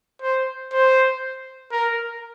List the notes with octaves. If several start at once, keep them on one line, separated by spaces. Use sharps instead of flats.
C5
C5
A#4